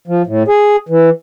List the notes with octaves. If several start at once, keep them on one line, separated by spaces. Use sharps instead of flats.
F3
A2
G#4
E3